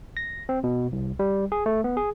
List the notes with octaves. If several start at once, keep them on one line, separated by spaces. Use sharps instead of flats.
A#6
C4
B2
C2
G3
G#4
A3
B3
G#4